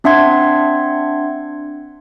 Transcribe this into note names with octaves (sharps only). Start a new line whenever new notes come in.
C4 D4 E5 F#5 C6 G#6